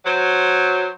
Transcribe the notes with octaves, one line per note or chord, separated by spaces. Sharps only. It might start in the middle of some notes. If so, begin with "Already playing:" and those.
F#3 C5